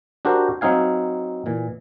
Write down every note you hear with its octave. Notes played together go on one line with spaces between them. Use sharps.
D4 F#4 G4 A#4 C5
F#3 C4 D#4 F5 G#5
A#2 E3